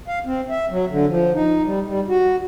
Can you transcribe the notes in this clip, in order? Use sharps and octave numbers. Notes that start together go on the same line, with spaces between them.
F5
C4
E5
F#3
D3
F3
D#4
G3
G3
F#4